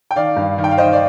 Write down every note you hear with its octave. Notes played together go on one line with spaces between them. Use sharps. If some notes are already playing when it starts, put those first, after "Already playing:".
G5
D#3 D5 F5
G2
D#3
G5
F5
D#3 C5 D#5
D5